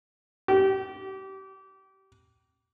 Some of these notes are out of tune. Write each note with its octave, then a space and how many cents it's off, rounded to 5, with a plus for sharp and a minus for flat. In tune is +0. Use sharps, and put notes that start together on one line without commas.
G4 -30